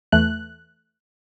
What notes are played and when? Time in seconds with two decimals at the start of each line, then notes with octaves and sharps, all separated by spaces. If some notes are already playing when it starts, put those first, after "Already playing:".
0.12 E2 E3 A3 F#6